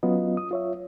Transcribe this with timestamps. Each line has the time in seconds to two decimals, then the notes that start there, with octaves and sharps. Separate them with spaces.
0.03 F#3 B3 C#4 F4 D#5
0.37 D#6
0.51 F4 C#5 E5